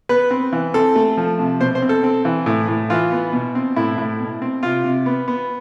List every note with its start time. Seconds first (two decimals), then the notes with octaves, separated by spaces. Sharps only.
0.09 B3 B4
0.31 C4
0.53 E3
0.74 C4 A4
0.96 A3
1.17 F3
1.39 C3
1.60 B2 C5
1.75 C5
1.82 C4
1.89 A4
2.04 C4
2.25 E3
2.46 A2
2.68 A2
2.90 E3 F4
3.12 B3
3.33 B2
3.55 C4
3.76 A2 E4
3.98 A2
4.20 B2
4.42 C4
4.63 C3 F4
4.84 C3
5.06 B3
5.28 B3